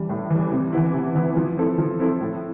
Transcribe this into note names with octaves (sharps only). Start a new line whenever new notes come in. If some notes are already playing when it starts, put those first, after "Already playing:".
Already playing: E3 G3
A2
E3 G3
C3
E3 B3 E4
C3
E3 B3 E4
F3
C4 E4 A4
F3
C4 E4 A4
A2